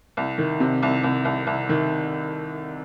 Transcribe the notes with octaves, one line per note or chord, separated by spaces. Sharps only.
C2
D#3
C3
C2
C2
C2
C2
D#3